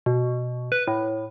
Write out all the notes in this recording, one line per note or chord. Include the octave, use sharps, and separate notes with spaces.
B2
B4
A2